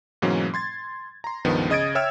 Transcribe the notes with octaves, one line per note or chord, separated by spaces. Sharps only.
G#2 B2 E3 F#3 A#3 C#4
C6 G#6 A6
A#5 C6
C#2 G2 D#3 F3 B3
C#3 D#5 D#6 G#6 A6 D7
C#5 E5 G5 E6 F6 G#6